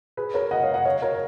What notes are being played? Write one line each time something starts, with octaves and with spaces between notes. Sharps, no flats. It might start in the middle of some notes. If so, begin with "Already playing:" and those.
G#4 B4
A#4 C#5
D#5 F#5
C#5 F5
D#5 F#5
C#5 F5
A#4 C#5